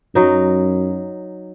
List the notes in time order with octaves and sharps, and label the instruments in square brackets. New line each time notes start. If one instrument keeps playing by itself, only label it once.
[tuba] F#2 [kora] F#3 D#4